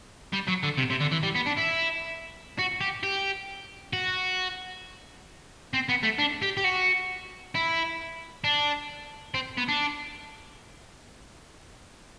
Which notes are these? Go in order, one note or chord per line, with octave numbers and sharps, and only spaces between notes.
G3
F#3
D3
C3
C3
D3
E3
G3
B3
D4
E4
F#4
G4
G4
F#4
C4
B3
A3
D4
G4
G4
F#4
E4
D4
C4
B3
D4